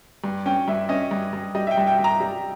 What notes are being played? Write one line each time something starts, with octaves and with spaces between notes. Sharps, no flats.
G2
C#4 G5
G2 E5
C#4 D#5
G2
G2
G3 D#5
E5
G5
G2
G5
G2
A#5
G3